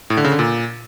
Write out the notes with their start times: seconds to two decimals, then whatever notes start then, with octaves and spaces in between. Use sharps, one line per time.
0.10 A2
0.17 D3
0.24 C#3
0.32 D3
0.39 A#2